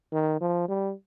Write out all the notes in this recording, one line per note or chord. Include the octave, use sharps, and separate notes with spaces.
D#3
F3
G3